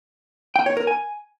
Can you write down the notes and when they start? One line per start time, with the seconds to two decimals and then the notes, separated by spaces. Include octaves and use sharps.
0.56 G5
0.66 C#5
0.77 A#4
0.87 G#5